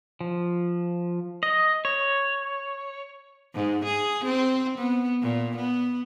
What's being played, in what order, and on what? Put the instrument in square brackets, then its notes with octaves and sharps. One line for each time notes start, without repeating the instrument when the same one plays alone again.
[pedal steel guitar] F3
D#5
C#5
[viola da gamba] G#2
G#4
C4
B3
A#2
B3